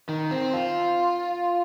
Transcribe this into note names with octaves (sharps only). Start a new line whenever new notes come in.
D#3
C4
F4